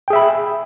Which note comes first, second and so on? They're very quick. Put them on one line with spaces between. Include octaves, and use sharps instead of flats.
G5 G#4 E5 B5